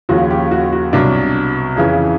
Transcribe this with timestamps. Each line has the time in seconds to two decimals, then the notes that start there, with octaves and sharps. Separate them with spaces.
0.09 D#2 C#3 F3 F#4
0.30 G4
0.51 F#4
0.72 F#4
0.93 C2 B2 F#3 D4
1.76 F2 C#3 E3